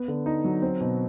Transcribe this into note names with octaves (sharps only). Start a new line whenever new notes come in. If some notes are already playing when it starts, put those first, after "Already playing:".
Already playing: B3
D3
D#4
F#3
C4
B2